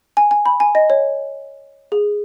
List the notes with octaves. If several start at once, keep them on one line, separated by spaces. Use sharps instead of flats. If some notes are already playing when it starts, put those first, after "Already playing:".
G#5
G#5
B5
G#5
D#5
C#5
G#4